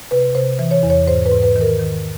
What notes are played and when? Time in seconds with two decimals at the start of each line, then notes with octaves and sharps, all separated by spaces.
0.11 C3 B4
0.35 C3 C5
0.59 E3
0.71 C#5
0.83 E2
0.90 C#5
1.07 G#2 C5
1.26 B4
1.32 G#2
1.43 B4
1.56 D#3
1.61 A#4
1.79 D#3